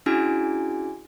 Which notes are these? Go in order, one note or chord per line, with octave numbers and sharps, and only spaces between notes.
C#4 D4 E4 F#4 G#4 G#5